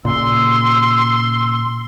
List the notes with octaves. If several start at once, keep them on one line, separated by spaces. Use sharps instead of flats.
A#2 C#3 C6 E6